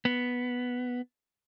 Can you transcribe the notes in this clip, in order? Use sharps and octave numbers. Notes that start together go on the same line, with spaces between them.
B3